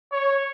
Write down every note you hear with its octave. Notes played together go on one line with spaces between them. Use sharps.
C#5